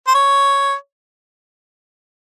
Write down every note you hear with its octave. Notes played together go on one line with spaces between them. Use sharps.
C5
C#5